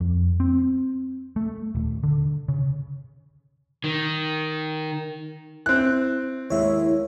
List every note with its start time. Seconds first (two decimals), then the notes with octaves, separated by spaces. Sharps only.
0.01 F2
0.40 C4
1.36 A3
1.75 D#1
2.03 D3
2.48 C#3
3.84 D#3
5.66 C4 E4 F#6
6.50 D#2 G#3 A#3 E4 C#5 E5